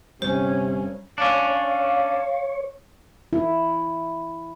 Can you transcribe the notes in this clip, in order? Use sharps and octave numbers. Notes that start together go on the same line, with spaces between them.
G1 D#2 C3 G3 C#4 C5
C#4 D4 C#5 F5
E4